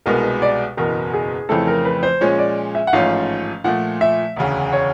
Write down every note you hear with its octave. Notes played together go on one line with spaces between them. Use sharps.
C2 B2 G#3 B3 A#4
B4
D5
F#1 E2 B2 A#4
G#4
F2 C#3 E3 A3 C4 A4
A#4
B4
C5
A#2 F3 G#3 C#4 C#5
D5
E5
F#5
A1 G#2 F3 A3 C#4 F5
A#2 F3 A3 F#5
E5
E1 D2 C#3
C#5